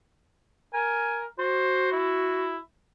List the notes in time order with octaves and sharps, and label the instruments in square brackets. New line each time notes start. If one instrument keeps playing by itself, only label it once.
[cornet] A#4 [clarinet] G#5
[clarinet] F#4 [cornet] C5
[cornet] E4